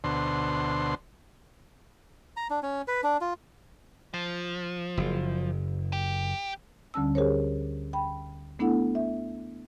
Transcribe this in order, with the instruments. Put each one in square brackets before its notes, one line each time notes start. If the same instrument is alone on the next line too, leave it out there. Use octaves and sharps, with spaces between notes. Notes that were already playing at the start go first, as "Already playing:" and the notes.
[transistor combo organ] D2 B2 D3 C5 C6
[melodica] A#5
D4
C#4
B4
D4
F4
[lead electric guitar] F3
[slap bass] F#1
[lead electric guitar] G4
[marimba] D2 D3 G3 C#4 A5 E6
G4 G#4 A#4 C5 C#5
G5 B5
A3 B3 D4 E4 A4 F#5
E5